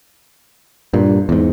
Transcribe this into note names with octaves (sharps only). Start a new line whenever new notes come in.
G2 A#2
E2 G#2